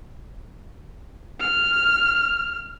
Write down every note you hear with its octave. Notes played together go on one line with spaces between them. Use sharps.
F6